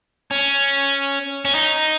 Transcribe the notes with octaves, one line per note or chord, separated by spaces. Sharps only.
C#4
C#4
D#4